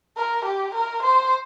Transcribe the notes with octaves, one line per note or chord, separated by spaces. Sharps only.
A#4
G4
A#4
C5